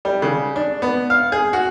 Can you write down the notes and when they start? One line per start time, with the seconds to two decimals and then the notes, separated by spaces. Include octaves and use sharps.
0.05 G3
0.22 C#3
0.56 D4
0.82 B3
1.10 F5
1.32 G#4
1.53 F#4